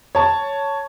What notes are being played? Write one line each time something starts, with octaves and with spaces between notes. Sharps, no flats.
C#5 A5